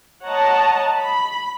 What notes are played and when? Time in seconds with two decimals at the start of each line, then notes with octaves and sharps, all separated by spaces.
0.24 C#5 D#5 F#5 A5 A#5
0.98 B5